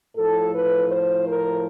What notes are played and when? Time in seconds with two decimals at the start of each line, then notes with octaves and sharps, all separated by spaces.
0.16 A2 F3 A4
0.52 B4
0.90 C5
1.27 A#4